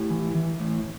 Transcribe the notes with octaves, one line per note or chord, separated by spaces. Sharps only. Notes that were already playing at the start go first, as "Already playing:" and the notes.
Already playing: A2 E4 G4
E3
E3
A2